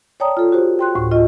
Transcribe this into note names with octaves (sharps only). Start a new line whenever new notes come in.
C#5 D5 G5 A5 A#5 D#6
F4 A4
F#4 G4 C5
G5 C6 F#6
D2 A2 C#6
F4 D#5